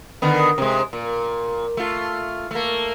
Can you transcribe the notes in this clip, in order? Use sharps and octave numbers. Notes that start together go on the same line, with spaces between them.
D3 D#3 B3
C3 G#3
A#2
A3 F4
A3 A#3